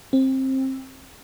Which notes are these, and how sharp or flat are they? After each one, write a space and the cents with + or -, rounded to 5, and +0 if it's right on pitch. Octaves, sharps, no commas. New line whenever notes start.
C4 +20